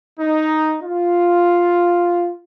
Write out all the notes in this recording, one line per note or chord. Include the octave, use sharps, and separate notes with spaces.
D#4
F4